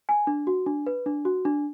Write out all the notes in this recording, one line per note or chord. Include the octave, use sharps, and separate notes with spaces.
G#5
D4
F#4
D4
B4
D4
F#4
D4